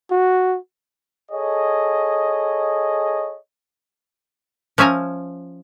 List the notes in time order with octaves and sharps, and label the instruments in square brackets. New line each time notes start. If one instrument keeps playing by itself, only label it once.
[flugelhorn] F#4
[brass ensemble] G#4 A4 C#5 D#5
[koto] F3 C#4 E5 G#5 A#5